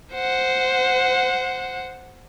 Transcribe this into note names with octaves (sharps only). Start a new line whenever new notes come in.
C5 F#5